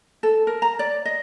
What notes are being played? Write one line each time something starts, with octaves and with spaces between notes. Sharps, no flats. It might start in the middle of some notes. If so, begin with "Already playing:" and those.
A4
A#4
A#5
D5
D#5